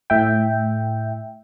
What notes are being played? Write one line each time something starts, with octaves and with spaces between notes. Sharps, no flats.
A2 E5 G5